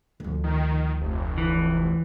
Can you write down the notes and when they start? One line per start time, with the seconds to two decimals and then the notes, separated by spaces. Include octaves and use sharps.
0.20 D2 F3
0.44 D#3
1.01 F1
1.38 E3